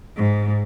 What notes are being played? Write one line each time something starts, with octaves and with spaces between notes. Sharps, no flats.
G#2